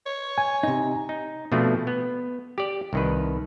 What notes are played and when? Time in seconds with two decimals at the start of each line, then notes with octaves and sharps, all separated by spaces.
0.06 C#5
0.38 G#5
0.63 C3 D#4
1.09 D#4
1.52 B2 F3 A3 C4 D4
1.87 B3
2.58 G4 D5
2.93 C2 D#3 B4